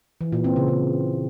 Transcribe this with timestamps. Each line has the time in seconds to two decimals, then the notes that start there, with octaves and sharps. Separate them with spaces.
0.21 E3
0.32 A#2
0.44 C4
0.56 C#3
0.68 C#3